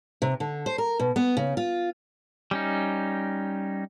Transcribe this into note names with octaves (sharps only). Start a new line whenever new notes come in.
C3
D3
C5
A#4
B2
B3
C#3
F4
G3 C#4 D#4